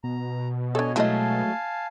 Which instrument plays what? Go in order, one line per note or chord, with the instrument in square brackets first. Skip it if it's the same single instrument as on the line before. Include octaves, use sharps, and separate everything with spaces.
[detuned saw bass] B2 [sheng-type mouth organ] A#5
[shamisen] D4 A4 [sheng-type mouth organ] C#5 D#5 G#5
[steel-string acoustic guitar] F#3 G#3 A3 [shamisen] E4 D#5 [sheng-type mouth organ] F5 G#5 A5